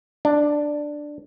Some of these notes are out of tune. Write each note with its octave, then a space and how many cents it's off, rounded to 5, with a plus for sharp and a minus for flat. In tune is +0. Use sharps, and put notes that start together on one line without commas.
D4 +5